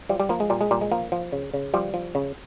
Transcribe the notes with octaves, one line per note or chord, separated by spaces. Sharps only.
F3 G3
G3
F3 A#3
G#3
A#2 G3
G#3
A#2 G3
G#3
F3 A#3
F3
C#3
C#3
F3 G3
F3
C#3